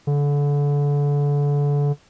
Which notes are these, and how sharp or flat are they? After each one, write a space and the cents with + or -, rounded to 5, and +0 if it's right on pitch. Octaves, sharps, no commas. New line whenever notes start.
D3 -30